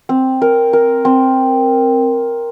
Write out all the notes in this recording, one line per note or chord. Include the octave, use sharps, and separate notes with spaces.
C4
A#4
A#4
C4